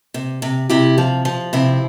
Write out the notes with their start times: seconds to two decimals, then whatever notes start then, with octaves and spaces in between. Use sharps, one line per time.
0.14 C3
0.42 C3
0.70 C3 E4 G4
0.98 F3
1.25 F3
1.53 C3 C4 E4